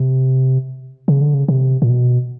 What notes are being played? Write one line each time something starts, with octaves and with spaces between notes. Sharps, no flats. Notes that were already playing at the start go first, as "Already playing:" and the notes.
Already playing: C3
C#3
D3
C#3
C3
A#2
B2